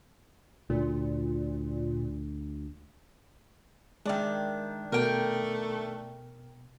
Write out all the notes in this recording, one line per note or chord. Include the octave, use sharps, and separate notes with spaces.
D2 A#2
D#3 G#3 D4 D5 E5
B2 A3 A#4 G5